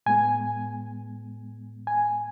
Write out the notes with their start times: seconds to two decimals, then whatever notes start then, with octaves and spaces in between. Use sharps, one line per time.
0.06 A2 G#3 B3 G#5
1.87 G#5